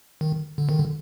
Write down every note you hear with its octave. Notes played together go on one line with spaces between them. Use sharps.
D#3
D3
D#3
D3